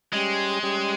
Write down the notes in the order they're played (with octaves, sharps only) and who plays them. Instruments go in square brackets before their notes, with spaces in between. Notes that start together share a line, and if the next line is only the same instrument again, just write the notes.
[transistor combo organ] G3 C#4 G4 [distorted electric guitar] G#3
[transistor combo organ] G3 C#4 G4